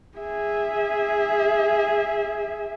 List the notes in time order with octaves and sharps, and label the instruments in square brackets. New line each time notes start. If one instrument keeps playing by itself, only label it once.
[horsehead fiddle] G#4 E5